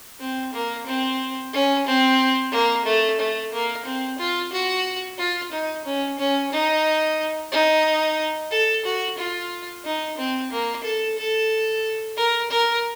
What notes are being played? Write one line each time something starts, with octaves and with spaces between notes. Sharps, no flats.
C4
A#3
C4
C#4
C4
A#3
A3
A3
A#3
C4
F4
F#4
F4
D#4
C#4
C#4
D#4
D#4
A4
F#4
F4
D#4
C4
A#3
A4
A4
A#4
A#4